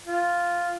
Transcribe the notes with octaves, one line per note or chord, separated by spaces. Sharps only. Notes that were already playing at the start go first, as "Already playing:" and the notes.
F4